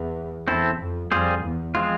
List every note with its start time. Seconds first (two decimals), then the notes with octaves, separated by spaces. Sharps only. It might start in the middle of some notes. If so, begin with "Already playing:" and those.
Already playing: E2
0.47 E2 C4 E4 A4
0.80 F2
1.11 F2 G3 C4 F4 G#4 C5
1.43 E2
1.75 F3 G#3 C4 F4